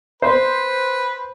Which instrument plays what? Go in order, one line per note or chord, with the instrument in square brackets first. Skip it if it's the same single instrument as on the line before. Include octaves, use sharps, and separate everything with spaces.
[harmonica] B4 [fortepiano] C5